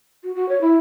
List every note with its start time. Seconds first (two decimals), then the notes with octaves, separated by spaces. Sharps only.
0.23 F#4
0.35 F#4
0.49 C#5
0.61 E4